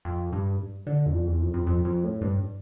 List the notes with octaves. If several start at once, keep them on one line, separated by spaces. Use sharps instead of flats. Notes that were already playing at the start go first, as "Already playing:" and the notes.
F2
G2
D3
E2
F2
E2
F2
F2
F2
F2
A2
G2